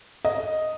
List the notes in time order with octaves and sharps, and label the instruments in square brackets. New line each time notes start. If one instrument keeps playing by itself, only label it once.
[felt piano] D#5